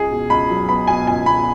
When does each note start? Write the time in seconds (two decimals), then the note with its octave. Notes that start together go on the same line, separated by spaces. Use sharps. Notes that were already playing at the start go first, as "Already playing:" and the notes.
Already playing: C#2 G#4
0.11 B2
0.30 C#2 B5
0.50 F#3
0.68 B3 B5
0.87 B2 G#5
1.07 C#2 G#5
1.26 B2 B5